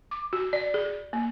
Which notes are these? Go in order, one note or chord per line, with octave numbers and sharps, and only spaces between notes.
D6
F#4
D5
G#4
A#3